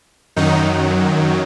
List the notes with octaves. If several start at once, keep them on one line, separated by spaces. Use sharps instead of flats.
F#2 D#3 F#3 D#4